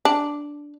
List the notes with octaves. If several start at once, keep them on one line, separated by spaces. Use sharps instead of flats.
D4